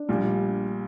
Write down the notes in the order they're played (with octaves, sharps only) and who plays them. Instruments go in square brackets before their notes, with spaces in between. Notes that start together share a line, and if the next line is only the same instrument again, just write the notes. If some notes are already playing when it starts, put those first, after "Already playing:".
Already playing: [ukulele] D4
[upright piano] A#1 A#2 G3